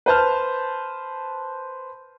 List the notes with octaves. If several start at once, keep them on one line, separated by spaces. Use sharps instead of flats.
B4 C5 A5 F6